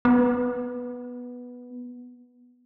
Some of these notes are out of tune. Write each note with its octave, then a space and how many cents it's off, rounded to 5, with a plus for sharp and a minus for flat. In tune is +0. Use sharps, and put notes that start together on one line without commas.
B3 -5